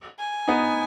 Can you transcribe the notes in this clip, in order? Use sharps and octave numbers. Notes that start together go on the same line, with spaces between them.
G#5
B3 D#4